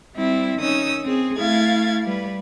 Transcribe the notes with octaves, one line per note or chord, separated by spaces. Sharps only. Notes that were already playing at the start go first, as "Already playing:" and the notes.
G3 C4 E4
D#3 C#4 D#4 D#6 E6
C4 G#4
A3 E4 F5 G#6 A6
G3 B4